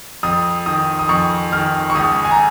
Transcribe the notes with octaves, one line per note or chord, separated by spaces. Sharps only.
F2 D#6
D#3 D#6
D#6
F2 C#6
D#3 F6
C#6
C#2 D#6
G#5
A#5